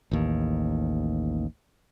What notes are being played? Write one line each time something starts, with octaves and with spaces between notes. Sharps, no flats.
A1 D#2